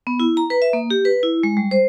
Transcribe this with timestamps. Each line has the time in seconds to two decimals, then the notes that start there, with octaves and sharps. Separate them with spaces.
0.07 B3
0.20 E4
0.37 A#5
0.50 B4
0.62 E5
0.73 A#3
0.90 G4
1.05 B4
1.23 E4
1.43 G#3
1.57 G3
1.71 C5